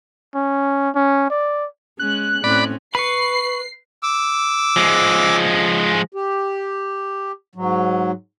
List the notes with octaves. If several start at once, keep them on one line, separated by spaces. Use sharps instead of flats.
C#4
C#4
D5
G#3 C#4 F#6
A2 C4 C#4 D5 B5
B4 B5 C#6 C7
D6 E6
F3 G#3
G4
G#2 F#3